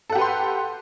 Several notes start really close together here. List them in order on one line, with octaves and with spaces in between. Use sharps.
A4 F#5 G4 B4 C6